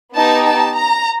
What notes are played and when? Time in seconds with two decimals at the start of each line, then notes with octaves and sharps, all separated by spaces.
0.14 B3 D#4 G4 A5
0.45 A5
0.76 A#5